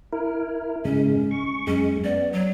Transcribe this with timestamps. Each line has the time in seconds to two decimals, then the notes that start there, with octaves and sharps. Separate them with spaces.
0.13 E4 A#4
0.85 G#2 C#3 G#3 C#4
1.31 C#6
1.67 F#2 G#3 C#4
2.04 B3 D5
2.33 F#3